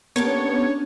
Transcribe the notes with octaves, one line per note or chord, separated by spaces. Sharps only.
A#3 B3 C#4 D4 G4 A4 C#5